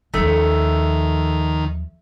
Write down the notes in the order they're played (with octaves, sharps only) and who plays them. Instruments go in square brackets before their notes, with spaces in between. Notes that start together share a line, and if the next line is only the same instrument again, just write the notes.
[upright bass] D#2 F3 [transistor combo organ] D#3 [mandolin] A3